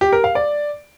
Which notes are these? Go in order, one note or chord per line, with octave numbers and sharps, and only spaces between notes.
G4
A#4
F5
D5